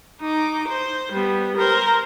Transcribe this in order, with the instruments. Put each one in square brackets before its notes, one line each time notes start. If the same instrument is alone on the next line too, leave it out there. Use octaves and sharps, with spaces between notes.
[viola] D#4 D6
C5
G3 B3
A#4 C5